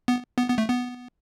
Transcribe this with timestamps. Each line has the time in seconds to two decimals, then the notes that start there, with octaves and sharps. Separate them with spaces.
0.08 B3
0.38 B3
0.48 B3
0.58 A3
0.69 B3